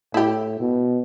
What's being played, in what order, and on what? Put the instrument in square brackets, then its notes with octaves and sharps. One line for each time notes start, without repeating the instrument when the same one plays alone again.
[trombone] A2 [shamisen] E4 G4
[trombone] B2